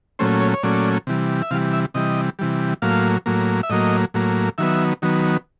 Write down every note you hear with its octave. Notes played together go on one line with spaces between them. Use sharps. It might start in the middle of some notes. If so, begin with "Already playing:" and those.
A#2 F#3 A3 C#4 C5
C#5
C#5
A#2 F#3 A3 C#4 D5
C3 E3 G3
E5
C3 E3 G3 F5
E5
C3 E3 G3 D#5
C3 E3 G3
A2 F#3 A#3 F5
A2 F#3 A#3
E5
A2 F#3 A#3 D#5
A2 F#3 A#3
D#3 F#3 B3 E5
D#3 F#3 B3